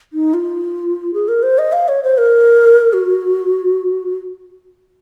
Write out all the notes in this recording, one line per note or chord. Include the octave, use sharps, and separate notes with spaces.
D#4
F4
G#4
A#4
C5
D#5
F5
C#5
C5
A#4
F#4